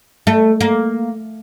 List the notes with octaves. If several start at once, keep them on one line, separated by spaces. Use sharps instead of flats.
A3
A#3